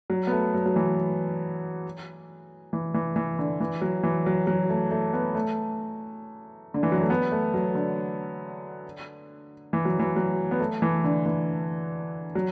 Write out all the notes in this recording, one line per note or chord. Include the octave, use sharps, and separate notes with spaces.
F#3
B3
A3
F#3
F#3
E3
E3
E3
E3
D3
E3
F#3
E3
F#3
F#3
A3
A3
B3
A3
D3
E3
F#3
A3
B3
A3
F#3
D3
E3
F#3
E3
F#3
B3
A3
E3
D3
E3
F#3